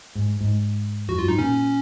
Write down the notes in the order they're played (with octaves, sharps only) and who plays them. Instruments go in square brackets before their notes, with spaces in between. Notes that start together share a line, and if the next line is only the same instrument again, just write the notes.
[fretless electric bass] G#2
G#2
[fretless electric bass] F2 [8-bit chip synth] F#4
[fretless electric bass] F#2 [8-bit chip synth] F4
[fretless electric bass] G#2 [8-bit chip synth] D#4
[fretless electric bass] A#2 [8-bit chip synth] C#4